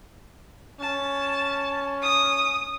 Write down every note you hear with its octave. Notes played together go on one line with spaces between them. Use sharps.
C#4 A5
D#6